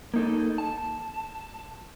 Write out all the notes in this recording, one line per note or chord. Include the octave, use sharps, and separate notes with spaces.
A#3 D#4 A4
A5